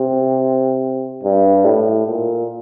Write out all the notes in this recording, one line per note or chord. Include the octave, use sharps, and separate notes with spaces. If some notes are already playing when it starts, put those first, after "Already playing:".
Already playing: C3
G2
A2
A#2